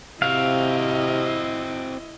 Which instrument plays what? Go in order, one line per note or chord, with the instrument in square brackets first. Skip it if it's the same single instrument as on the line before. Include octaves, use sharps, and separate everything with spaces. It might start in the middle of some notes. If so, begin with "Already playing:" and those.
[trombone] C3 [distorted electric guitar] C4 F#4 [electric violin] E4 D#5 [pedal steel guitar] F5